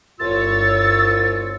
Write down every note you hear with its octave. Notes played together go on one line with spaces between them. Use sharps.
G1 C2 F4 C#5 E6 A6